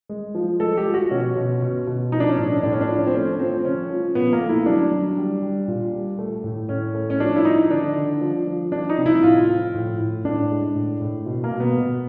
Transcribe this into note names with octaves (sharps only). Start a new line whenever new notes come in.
G#3
F3
G#3 A4
G4
F3
F#4
B2 C#4
B2
B2
B2
F3 D#4
D4
C#4
A2 D4
A2 D4
C#4
D4
F3
C4
A3 C#4
F3 C4
C#3 C#4
F3
A#2 B3
A#3
A3
E4
F#3 D4
F#3
G3
G3
A#2
G3
A3
A2
A2 C#4
A3
C#4
F3 D4
E4
F3 D#4
D3 D4
D3
F3
F3
F3 D4
D#4
C3
E4
A2 F4
F3
A2
A2
A2 D4
G#3
A2
A2
B2
A#3
B2
B3
B2